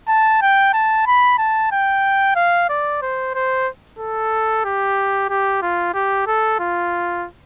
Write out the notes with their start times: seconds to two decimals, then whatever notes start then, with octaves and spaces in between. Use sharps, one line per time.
0.08 A5
0.42 G5
0.74 A5
1.07 B5
1.38 A5
1.72 G5
2.36 F5
2.70 D5
3.02 C5
3.35 C5
3.99 A4
4.65 G4
5.30 G4
5.62 F4
5.94 G4
6.27 A4
6.60 F4